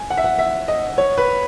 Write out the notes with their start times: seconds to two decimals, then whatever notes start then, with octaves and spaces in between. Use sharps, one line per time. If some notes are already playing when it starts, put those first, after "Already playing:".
Already playing: G#5
0.10 F#5
0.17 E5
0.24 F#5
0.39 E5
0.68 D#5
0.98 C#5
1.18 B4